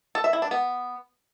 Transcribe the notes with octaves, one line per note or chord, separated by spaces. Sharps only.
A4
E5
E4
D4
B3